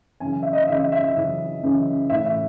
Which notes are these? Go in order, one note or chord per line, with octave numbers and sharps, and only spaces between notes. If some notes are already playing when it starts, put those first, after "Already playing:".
F#2 C#3 E3 G#5
E5
D#5
F#2 C#3 E3 E5
E5
E5
E5
F#2 C#3 E3
F#2 C#3 E3
A2 E3 E5
E5